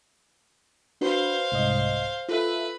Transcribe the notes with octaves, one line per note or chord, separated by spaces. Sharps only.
D4 F#4 B4 C5 F5
C2 G#2 D#5
F4 A4 B4 E5